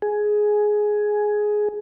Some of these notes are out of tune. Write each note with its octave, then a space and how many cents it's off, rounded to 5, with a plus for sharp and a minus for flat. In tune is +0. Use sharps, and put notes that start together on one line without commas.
G#4 +10